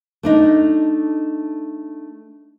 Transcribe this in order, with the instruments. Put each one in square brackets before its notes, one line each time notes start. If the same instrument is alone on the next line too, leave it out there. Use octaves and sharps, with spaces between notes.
[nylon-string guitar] A3 D4 D#4